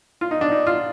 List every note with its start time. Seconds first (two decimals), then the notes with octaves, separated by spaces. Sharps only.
0.21 F4
0.31 D#4
0.41 D4
0.51 D#4
0.67 F4